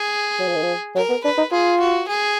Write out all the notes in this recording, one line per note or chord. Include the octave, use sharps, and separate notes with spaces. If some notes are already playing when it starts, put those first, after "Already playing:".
Already playing: G#4
F#3
F3
D#3
F3
F#3 A#4
B3
D4 B4
D#4
F4 G#4
F#4
G#4